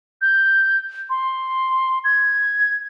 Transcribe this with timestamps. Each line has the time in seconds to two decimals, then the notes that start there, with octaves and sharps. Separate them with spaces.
0.22 G6
1.10 C6
2.05 G#6